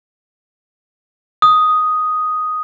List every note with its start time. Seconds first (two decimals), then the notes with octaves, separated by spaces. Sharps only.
1.42 D#6